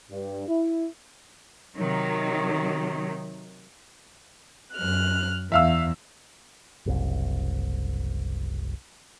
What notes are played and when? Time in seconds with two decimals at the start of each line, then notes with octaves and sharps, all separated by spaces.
0.11 G2
0.49 E4
1.76 C3 D#3 F#3
4.75 F#2 F6 F#6
5.52 E2 E5 F5 E6
6.86 F#1 C2